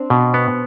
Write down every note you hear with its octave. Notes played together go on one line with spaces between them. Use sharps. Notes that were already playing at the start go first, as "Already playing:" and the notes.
Already playing: C4 D4
B2
B3